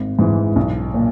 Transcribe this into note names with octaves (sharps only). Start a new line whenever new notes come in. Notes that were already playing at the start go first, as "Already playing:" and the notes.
Already playing: G#1
G#2 E3
B1
A#2